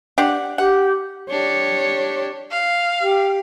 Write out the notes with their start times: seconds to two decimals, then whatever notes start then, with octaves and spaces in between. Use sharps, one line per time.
0.18 D4 G4 F#5
0.58 G4 F#5
1.30 D4 G4 C#5
2.52 F5
3.03 G4